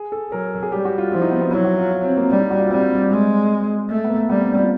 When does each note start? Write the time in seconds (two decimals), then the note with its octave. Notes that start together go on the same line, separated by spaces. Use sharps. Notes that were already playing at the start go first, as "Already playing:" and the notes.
Already playing: G#4
0.12 A4
0.32 F#3 A#4
0.63 G#4
0.72 G3 G4
0.85 F#4
0.98 F4
1.12 F3 E4
1.21 D#4
1.31 B3
1.41 B3
1.51 F#3 E4
1.64 F#4
1.78 F4
1.91 F4
2.04 C4
2.17 A#3
2.30 G3 D4
2.40 D#4
2.51 F#4
2.60 F4
2.70 G3 C4
3.10 G#3
3.89 A3
4.05 B3
4.10 A#3
4.29 G3 B3
4.39 C4
4.49 D4
4.59 F4